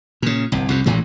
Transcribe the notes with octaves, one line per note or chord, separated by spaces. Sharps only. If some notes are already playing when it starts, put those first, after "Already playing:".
A#2 C#3
G1 C2
C2 F2 C3
A1 A2 E3 G#3